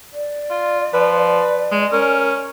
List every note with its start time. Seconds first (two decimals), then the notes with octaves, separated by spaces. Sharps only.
0.13 D5
0.50 F4
0.94 F3 B4
1.71 G#3
1.92 C#4 A#4